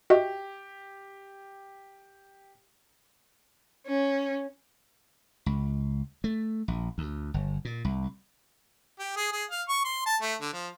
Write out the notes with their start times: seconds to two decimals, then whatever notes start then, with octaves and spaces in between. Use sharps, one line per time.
0.10 F#4 G4 D#5 E5
3.85 C#4
5.46 C#2
6.24 A3
6.68 A#1
6.98 D2
7.34 G1
7.65 A#2
7.85 C2
8.99 G4
9.17 G#4
9.32 G#4
9.51 F5
9.69 C#6
9.85 C6
10.06 A5
10.22 A3
10.41 D3
10.54 F3